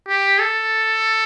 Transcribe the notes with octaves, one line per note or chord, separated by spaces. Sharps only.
G4
A4